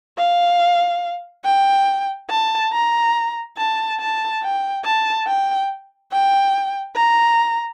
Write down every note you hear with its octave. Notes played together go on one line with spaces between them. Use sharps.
F5
G5
A5
A#5
A5
A5
G5
A5
G5
G5
A#5